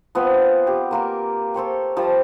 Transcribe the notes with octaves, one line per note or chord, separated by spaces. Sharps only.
F3 B3 C4 F4
G4
A#3 F4 A#4
A4 C5 C#5 G5
F3 G3 G5 A5